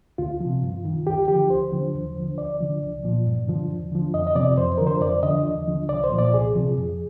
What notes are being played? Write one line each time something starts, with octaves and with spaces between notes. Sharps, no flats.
D2 F4
C3 F3
G2
D#3
D2 G4
D3 F3 G4
D2 C5
D3 F3
D#2
D3 F3
D2 D5
D3 F3
C2
A#2 F3
G2
D3 F3
D#2
D3 F3
F2 D#5
D#5
C3 F3 D5
F2 C5
D3 F3 A#4
C5
F2 D5
D3 F3 D#5
D#2
D3 F3
C2 D5
C5
A#2 F3
D5
C2 G#4
C3 F3
F2